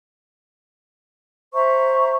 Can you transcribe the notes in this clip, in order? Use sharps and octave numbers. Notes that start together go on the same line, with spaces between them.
C5 E5 A#5 C#6